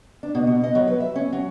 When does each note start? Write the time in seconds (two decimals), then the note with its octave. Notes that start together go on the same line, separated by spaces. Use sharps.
0.23 D4
0.35 B2
0.47 B2
0.63 D#5
0.75 F#3
0.88 B4
1.00 E5
1.16 C#4
1.32 F#3